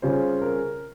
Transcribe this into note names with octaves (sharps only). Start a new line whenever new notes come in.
C#3 G3 C#4 F4 C5
A#4